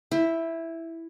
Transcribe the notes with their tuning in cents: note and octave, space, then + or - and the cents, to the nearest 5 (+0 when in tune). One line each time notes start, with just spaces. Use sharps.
E4 +0 G5 +30